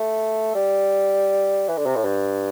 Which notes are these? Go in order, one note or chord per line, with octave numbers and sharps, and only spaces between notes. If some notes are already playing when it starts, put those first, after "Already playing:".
Already playing: A3
G3
E3
D3
C3
A2
G2